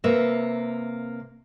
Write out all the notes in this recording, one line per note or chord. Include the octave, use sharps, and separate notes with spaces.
C3 A#3 B4 E5